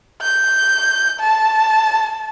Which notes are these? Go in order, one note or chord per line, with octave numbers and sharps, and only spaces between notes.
G6
A5